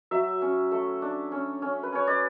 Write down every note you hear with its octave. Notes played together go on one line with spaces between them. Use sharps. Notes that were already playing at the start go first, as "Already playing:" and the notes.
F#3 E5
C#4
A3
D4
C#4
C#4
B4
C#4 C#5
D5